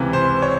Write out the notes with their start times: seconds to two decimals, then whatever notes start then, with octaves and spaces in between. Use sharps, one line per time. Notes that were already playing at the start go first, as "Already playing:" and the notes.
Already playing: C#2 C3 E3
0.13 C5
0.42 C#5